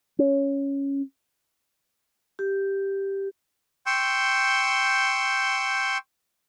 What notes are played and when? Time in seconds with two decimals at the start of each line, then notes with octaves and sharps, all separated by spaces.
0.19 C#4
2.39 G4
3.86 G5 C6 C#6 E6 G6